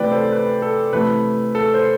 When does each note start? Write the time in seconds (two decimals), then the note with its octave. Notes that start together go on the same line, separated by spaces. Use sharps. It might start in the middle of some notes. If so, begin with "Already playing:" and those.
Already playing: C3 E3 A3 B4 D5 G5
0.12 A4 C5
0.32 B4
0.62 A4
0.92 C3 E3 A3 B4
1.55 A4
1.74 C5